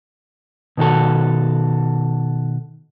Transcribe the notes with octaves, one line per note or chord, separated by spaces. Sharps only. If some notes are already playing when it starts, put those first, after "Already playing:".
B2 D#3 F#4 A4